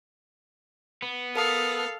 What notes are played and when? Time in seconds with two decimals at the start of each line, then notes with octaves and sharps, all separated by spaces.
1.02 B3
1.36 A4 A#4 F5 A5 D#6